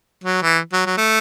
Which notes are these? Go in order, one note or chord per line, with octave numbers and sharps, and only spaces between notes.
F#3
E3
F#3
F#3
A3